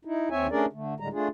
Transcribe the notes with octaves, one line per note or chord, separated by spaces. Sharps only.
D#4 E4
D#2 C4 C#5 E5 G#5
A3 C#4 D4 G#4 A#4 D5
D3 A3
A2 D3 G3 G#3 A#5
A3 D4 F4 G#4